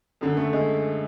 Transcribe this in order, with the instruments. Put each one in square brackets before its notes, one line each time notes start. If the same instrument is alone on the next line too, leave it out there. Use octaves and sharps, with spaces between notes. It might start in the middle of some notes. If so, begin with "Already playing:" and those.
[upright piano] F#2 D3
A3
G#3